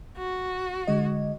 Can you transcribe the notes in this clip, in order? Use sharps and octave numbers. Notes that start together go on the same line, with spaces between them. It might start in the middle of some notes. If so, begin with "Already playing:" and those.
F#4
D3 G#3 D#5